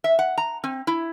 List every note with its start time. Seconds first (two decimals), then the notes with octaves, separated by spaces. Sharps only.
0.04 E5
0.19 F#5
0.37 A#5
0.64 C4
0.87 E4